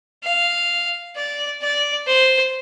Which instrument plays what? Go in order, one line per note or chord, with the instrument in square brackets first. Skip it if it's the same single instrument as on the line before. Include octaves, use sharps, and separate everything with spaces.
[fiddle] F5
D5
D5
C5